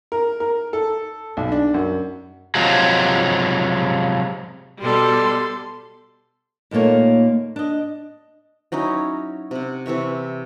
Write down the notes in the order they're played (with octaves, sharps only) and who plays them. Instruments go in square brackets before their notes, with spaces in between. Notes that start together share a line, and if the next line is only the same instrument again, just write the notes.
[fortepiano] A#4
A#4
A4
B1
D4
F#2
[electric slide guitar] C3 F3 F#3 G#3
[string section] B2 G3 [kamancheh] A4 C6
[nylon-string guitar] D#2 A#2 A3 A#3 C#5
D4 D#5
[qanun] F#3 C#4 D#4 E4
C3 F#5
C3 E3 E5 C#6